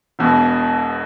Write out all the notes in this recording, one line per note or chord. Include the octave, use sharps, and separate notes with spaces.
E1 E2 B2